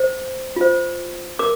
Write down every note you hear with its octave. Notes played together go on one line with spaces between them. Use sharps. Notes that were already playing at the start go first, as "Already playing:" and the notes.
Already playing: C5
F4 C5
A#4 D6